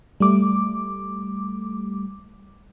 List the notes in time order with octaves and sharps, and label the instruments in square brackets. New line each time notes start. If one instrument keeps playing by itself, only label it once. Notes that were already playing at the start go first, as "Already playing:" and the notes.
[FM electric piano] G3 A3 D6